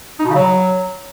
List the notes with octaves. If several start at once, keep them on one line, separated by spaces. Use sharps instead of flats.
D#4
B2
C#3
F#3